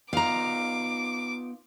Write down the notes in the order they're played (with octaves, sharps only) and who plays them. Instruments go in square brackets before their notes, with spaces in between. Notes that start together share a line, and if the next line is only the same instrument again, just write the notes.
[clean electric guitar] B3 D#4 F4 [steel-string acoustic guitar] F5 A#5 [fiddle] D6